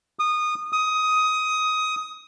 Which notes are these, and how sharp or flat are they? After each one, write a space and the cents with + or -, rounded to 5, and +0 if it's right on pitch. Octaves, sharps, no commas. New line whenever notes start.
D#6 -20
D#6 +15